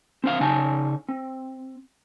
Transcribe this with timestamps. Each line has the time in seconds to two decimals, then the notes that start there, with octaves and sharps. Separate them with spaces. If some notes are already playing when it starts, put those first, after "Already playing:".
0.24 C4 D4 F5
0.41 C#3 D#4 G#5 A5
1.09 C4